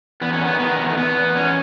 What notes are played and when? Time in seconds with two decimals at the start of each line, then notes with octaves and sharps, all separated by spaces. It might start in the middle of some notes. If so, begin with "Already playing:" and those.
0.21 E2 B3
0.33 C#4
0.41 D#3 B3
0.59 D#3 B3
0.79 E2
0.90 A3
0.98 E2 B3
1.17 E2
1.36 E2 C#4